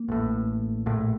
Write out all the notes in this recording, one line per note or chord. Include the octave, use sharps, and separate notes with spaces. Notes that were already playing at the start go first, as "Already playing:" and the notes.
Already playing: A#3
A1 A2
A#1 A2